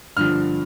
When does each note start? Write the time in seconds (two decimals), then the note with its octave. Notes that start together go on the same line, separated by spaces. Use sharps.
0.17 G2 D3 F3 F6